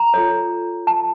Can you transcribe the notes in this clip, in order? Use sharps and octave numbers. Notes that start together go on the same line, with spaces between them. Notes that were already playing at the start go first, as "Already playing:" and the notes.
Already playing: A#5
F4 A4 C#5
A5